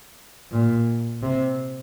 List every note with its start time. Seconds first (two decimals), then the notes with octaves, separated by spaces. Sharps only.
0.52 A#2
1.23 C3